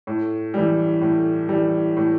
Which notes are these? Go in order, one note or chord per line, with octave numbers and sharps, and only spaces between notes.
A2
E3 G3
A2
E3 G3
A2